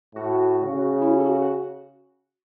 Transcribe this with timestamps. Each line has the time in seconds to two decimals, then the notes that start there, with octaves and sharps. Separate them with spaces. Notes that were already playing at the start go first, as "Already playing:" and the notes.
0.15 A2 F#4
0.63 C#3
1.01 E4
1.11 F#4
1.20 A4
1.26 F#4
1.42 F#4